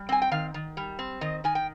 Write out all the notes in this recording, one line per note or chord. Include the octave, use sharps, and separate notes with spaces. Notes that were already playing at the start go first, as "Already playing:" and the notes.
Already playing: G3
C4 G#5
G5
D#3 F5
D#3
G3
C4
D#3 D#5
D#3 G#5
G5